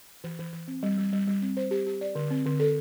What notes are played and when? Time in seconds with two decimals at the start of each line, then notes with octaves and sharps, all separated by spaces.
0.24 E3
0.39 E3
0.53 E3
0.68 C4
0.83 G3
0.98 G3
1.13 G3
1.28 G3
1.42 C4
1.57 C5
1.71 G4
1.87 G4
2.01 D5
2.15 D3
2.31 C4
2.46 D3
2.60 A4